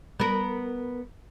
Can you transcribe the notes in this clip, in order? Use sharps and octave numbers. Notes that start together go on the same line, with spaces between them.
B3 A#4